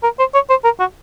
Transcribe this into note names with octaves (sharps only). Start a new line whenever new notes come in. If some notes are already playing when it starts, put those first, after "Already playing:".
A#4
C5
C#5
C5
A#4
F#4